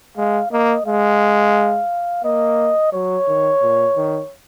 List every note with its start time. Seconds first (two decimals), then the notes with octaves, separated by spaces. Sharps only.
0.17 G#3 F5
0.51 A#3 D#5
0.86 G#3 F5
2.24 A#3 D#5
2.92 F#3 C#5
3.27 D#3
3.62 A#2
3.96 D#3